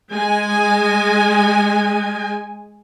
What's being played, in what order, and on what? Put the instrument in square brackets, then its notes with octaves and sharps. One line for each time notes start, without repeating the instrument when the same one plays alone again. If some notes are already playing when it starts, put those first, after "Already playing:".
[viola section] G#3 G#5